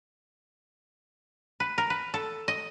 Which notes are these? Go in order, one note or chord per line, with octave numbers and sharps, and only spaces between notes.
B4
A#4
B4
A4
D#5